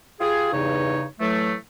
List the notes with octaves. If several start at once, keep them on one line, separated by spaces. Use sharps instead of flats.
F4 G4 G#4
E2 G2 C#3 D#4 C#5
A2 E3 F#3 A3